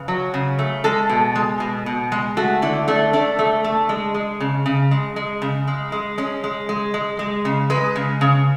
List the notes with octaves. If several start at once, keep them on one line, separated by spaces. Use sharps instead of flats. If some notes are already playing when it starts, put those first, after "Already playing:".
Already playing: C#3 B4
F#3
C#3
A3
G#3 A4
B2
G#3
B2
B2
G#3
A3 F#4
D3 E4
A3 D4
A3 D4
A3
A3
G#3
G#3
C#3
C#3
G#3
G#3
C#3
G#3
G#3
G#3 C#4
G#3
G#3
G#3
G#3
C#3
G#3 B4
C#3
C#3